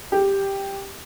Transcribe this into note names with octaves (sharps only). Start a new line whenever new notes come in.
G4